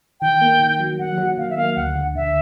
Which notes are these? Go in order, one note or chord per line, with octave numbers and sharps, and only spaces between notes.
D#3 G5
A#3
D#3
F#3
F#3 F#5
F#3
D#3 F5
E5
A#3 F5
D2 F#5
D3
D3 E5